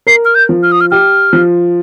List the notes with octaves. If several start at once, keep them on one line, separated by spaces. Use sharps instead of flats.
A#4 C7
F6
G6
F3
F6
D#6
F6
G4 F6
F3